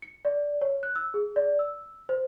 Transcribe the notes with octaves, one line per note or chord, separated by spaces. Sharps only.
C#7
D5
C#5
F#6
E6
G#4
D5
E6
C5